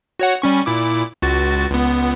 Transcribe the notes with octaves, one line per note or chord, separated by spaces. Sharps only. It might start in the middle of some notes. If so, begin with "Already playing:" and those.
F#4 C#5 F#5
G3 C#4 C#6
A#2 E4 D6
C#2 F#4 A6
C#2 B3